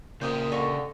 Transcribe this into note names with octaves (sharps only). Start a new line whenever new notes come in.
A#2 C#3 G4 C5 D#5
D3 D#5 F5 C#6